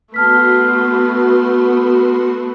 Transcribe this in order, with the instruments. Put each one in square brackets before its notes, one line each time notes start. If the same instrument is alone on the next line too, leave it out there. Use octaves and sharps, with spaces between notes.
[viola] A3 B3 [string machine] F#4 C6 [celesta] A5 F6 B6